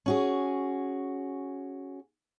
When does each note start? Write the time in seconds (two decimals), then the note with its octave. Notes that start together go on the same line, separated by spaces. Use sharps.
0.06 C#4 F#4 G#4